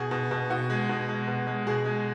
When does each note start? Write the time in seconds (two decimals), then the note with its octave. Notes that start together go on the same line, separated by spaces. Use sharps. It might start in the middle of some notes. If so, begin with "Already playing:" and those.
Already playing: B2 G#4
0.11 B2
0.31 B2
0.50 B2 F#4
0.70 G#3
0.89 B2
1.09 G#3
1.28 B2
1.47 G#3
1.67 B2 G#4
1.85 G#3